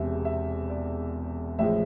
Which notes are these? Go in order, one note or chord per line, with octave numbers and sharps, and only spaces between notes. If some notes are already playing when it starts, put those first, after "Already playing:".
Already playing: E1 E2 C3 E5
E5
D5
A1 A2 F3 G#3 E5